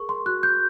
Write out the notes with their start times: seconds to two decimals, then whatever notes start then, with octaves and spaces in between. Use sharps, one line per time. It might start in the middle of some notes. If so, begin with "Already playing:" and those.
Already playing: G#4 A#4 C#6
0.09 C6
0.26 F#4 F#6
0.43 G6